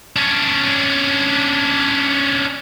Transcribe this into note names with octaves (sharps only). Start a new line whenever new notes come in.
C#4 D4